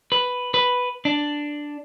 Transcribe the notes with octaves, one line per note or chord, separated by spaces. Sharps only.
B4
B4
D4